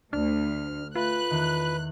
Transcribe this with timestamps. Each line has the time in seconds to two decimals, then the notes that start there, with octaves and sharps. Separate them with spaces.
0.13 D2 D4 F6
0.95 A3 F4 B4 F#6 A6 B6
1.31 E2 D#3